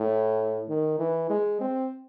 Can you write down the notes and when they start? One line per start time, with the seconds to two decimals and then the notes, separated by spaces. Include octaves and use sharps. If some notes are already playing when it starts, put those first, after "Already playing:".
Already playing: A2
0.69 D#3
0.99 E3
1.30 G#3
1.61 C4